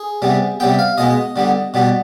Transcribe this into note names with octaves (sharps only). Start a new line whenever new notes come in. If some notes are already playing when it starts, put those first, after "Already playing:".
Already playing: G#4
C3 G3 B3
C3 G3 B3 G5
F5
B2 G#3 B3 D#5
D3 G3 B3
B2 G3 B3